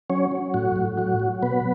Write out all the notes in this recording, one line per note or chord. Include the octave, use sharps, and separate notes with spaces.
F#3 C#4 C#5
F#3
A2 F#4
A2
F#3 F#4
F#3
B2 B3 B4